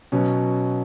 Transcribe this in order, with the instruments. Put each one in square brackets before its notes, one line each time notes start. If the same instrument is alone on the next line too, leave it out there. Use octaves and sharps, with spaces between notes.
[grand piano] B2 F#3 B3 C#4